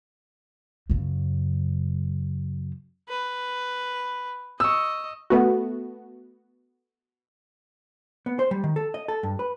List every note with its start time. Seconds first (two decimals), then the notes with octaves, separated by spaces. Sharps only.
0.90 F#2 C#3
3.09 B4
4.60 D#5 C#6 E6
5.30 A3 B3 F#4
8.26 B3
8.39 C5
8.51 G3
8.64 D#3
8.76 A4
8.94 D#5
9.08 A4
9.23 G2
9.39 B4